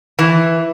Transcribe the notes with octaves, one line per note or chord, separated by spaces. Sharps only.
E3